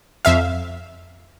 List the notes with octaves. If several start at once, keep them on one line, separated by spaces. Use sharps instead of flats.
F2 E5 F5